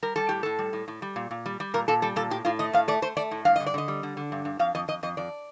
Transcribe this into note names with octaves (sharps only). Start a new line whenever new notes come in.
G3 A#4
G3 A4
A2 G4
A2 A4
G3
A2
A2
G3
A#2
A#2
G3
G3
A#2 A#4
A#2 A4
G3 A4
A#2 A4
A2 G4
A2 F4
A3 D#5
A2 F5
A3 D5
A3 C5
A3 D5
A2
G2 F5
D3 D#5
D5
D3 D#5
G3
D3
D3
G2
G2
F2 F5
F2 D#5
F2 D#5
F2 D#5
F2 D5